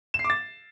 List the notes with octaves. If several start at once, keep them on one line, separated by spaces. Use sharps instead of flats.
E7
C7
D6
A6